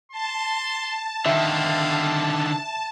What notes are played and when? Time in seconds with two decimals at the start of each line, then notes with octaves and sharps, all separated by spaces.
0.12 A5 C6
1.26 D3 D#3 E5 F5